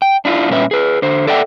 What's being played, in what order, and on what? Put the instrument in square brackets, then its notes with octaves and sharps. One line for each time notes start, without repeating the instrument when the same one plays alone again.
[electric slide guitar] G5
D4 E4 F4
G2 A#2 C#4 B4 E5
G#4 B4
D3 C5
A4 D5 E5 F#5 G5